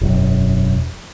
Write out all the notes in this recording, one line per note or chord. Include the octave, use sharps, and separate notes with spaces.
E1 F#2